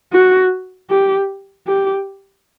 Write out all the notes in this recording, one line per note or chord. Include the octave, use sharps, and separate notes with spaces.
F#4
G4
G4